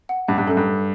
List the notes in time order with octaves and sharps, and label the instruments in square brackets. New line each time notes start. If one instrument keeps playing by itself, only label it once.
[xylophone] F#5
[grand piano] G2 [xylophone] F#5
[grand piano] G2
[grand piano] F#2 [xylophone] A4
[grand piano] G2
[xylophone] A4